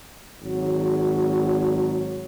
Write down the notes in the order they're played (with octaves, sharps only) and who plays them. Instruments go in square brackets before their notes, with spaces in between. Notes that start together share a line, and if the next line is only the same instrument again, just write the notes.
[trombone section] G#1 F#3